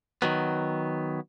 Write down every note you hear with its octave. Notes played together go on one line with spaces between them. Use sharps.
D#3 F#3 B3